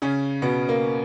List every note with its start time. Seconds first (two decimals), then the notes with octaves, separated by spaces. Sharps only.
0.02 C#3 C#4
0.42 B2 B3
0.69 A#3